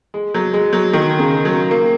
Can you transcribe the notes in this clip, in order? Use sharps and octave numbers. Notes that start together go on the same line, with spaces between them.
G#3
F#3
G#3
F#3
D#3
C#3
F#3
A#3